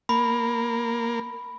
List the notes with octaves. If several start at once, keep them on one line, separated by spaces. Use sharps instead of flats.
A#3 B5